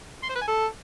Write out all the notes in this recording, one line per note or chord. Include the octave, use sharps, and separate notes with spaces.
C6
C5
B4
G#5
A4